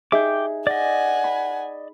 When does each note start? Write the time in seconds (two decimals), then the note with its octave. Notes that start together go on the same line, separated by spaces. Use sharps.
0.12 D#4 G#4 E5 G5 D6
0.67 D5 D#5 F#5 G#5
1.24 B5